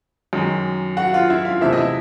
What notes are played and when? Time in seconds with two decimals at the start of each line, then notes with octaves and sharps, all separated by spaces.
0.33 F#2 D#3 G#3
0.97 F#4 F#5
1.13 F4 F5
1.30 E4 E5
1.45 F4 F5
1.61 E2 C3 F3 A3 E4 E5
1.72 D#5
1.77 E4 E5